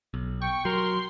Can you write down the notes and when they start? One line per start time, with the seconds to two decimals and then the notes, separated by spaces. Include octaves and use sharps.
0.14 B1
0.42 G5 C#6
0.65 F#3 A#4 C6